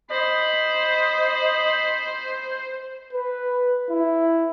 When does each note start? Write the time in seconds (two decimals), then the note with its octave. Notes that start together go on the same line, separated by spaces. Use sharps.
0.10 C5 D#5 B5
3.13 B4
3.90 E4